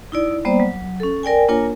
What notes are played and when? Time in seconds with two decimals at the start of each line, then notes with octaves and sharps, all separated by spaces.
0.12 D#4 E4 D5
0.45 G3 A#3 B3 C5 D5
0.60 F#3
1.00 C#4 A4
1.23 A#4 D5 G5 G#5
1.48 A#3 D4 F4 A#4 C#5 G#5